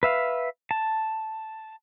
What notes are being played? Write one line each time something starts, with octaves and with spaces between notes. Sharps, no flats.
B4 E5 F5
A5